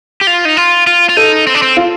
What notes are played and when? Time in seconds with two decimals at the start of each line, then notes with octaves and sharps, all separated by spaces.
0.21 G4
0.27 F4
0.45 D#4
0.57 F4
0.87 F4
1.09 F4
1.17 D#4 A4
1.47 C4
1.55 D4
1.62 C4
1.77 F4